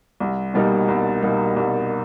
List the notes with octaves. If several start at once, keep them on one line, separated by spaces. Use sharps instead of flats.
C2
B2 G3 A#3 D#4
C2
B2 G3 A#3 D#4
C2